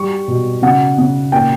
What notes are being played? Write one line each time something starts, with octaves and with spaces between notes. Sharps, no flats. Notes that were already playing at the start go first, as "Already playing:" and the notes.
Already playing: G3 C#6
B2
C#3 F#5
C#3
A#2 G5